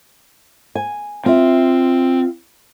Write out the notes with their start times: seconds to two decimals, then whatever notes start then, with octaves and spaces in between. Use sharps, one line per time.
0.75 G#5
1.26 C4 F4 E5